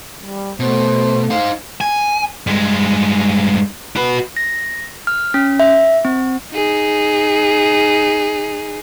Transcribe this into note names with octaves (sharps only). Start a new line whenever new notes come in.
G3
B2 A3 C5
D#4 C5 F5
G#5
G2 G#3
F#4 B4
A#6
F6
C#4
E5
C4
D#4 G#4